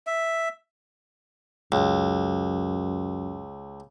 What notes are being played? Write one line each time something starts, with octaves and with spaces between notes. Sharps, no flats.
E5
C#2 F#2